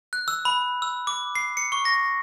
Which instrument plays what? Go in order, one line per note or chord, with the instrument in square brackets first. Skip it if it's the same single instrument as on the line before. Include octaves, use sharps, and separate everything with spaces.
[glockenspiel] F#6
E6
B5
E6
D6
C7
C#7
C#6
A#6